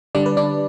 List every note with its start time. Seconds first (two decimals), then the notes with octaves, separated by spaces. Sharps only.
0.15 D3 G3 D4 D5
0.26 B4
0.37 D4 D5